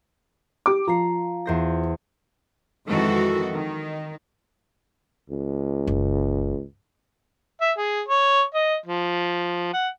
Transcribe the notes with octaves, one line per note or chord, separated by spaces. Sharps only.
G4 D6
F3 A#5 C7 C#7
E2 C5 A#6
F2 D#3 E3 G#3 F#4 A4
D#3
C#2
F#1
E5
G#4
C#5
D#5
F3
F#5